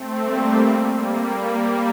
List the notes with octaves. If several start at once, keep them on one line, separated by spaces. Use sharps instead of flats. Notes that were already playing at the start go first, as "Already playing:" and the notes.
Already playing: A3 C4
G3 A#3
G3 A#3
G3 A#3